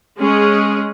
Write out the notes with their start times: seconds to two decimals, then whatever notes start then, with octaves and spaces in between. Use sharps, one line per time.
0.19 G#3 C#4 G#4